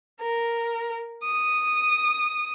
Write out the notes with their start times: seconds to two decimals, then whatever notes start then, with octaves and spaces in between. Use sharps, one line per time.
0.19 A#4
1.23 D#6